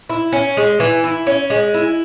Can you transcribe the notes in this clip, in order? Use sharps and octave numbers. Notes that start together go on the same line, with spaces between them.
E4
C#4
G#3
E3
E4
C#4
G#3
E4